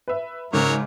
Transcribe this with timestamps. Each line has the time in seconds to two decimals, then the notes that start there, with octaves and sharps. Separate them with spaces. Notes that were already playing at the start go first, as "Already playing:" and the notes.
0.08 B4 E5
0.53 G#2 C#3 F#3 A#4 C#5